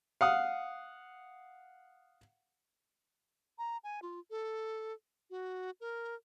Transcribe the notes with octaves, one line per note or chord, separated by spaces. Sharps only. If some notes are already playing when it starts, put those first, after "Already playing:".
F5 F#5 D#6
A#5
G#5
F4
A4
F#4
A#4